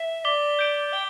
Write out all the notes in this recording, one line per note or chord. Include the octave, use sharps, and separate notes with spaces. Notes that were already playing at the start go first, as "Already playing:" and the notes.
Already playing: E5
D5 D6 B6 G7
G6 D7 G7
G5 G7